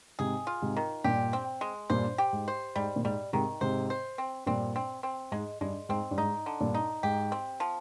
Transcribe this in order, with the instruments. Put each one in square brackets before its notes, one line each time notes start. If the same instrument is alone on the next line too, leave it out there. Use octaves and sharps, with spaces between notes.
[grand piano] G#2 C3 [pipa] G#4
[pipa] F4
[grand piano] G#2 C3
[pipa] D#3
[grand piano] G2 A#2 [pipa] G4
[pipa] C4
G#3
[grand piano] G2 A#2 [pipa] C5
[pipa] G4
[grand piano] G#2
[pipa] C5
[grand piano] G#2 [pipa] G3
[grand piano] A#2
[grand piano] G#2 [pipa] G3
[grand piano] G#2 C3 [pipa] D#3
[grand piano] G#2 C3 [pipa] C5
[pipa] C5
C4
[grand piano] G2 A#2 [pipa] C4
[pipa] C4
C4
[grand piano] G#2 [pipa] G#3
[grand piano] G2 [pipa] G#3
[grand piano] G#2 [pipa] C4
[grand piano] G2
[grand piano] G#2 [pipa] D#4
[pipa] D3
[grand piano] G2 A#2
[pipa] D#4
[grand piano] G#2 [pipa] G4
[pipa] C4
F3